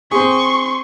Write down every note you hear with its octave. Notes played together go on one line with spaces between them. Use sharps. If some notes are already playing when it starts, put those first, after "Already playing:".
C4 G#4 C6 C#6